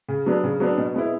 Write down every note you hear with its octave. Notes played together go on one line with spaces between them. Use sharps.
C#3
F#3 B3 D4
C#3
F#3 B3 D4
B2
G#3 B3 E4